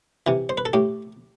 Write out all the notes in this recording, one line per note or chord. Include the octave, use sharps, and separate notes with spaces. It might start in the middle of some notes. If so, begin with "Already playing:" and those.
C3 E3
C5
B4
A4
A2 G4